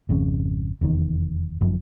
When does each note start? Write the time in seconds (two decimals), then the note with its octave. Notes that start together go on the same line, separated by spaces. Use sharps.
0.09 G#1 F2 C#3
0.81 F1 E2 D#3
1.61 G1 F#2 F3